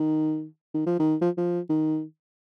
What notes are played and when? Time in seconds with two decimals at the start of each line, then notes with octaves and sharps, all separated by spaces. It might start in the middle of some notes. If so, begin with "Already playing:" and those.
Already playing: D#3
0.74 D#3
0.86 F3
1.00 D#3
1.22 F3
1.38 F3
1.70 D#3